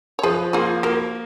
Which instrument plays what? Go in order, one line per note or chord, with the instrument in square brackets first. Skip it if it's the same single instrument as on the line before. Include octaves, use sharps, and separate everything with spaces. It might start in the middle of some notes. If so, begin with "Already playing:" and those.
[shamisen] C#5
[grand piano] F3 [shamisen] G#4 B4
[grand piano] A#3 [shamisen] F4 G#4
[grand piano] A#3 [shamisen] F#4 A#4